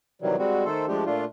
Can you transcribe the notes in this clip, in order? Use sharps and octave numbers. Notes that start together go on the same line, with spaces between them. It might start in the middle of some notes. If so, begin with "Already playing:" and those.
C3 D#3 E3 F#3 G3
G3 G#3 C4 F#4
D#3 A3 A4 C5
F3 G#3 A3 D4 G4
A#2 A3 D4 F4